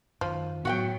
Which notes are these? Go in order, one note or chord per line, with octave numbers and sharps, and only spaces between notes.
F#2 D#3 F3
A2 F#3 B3 F#4 F#5 G5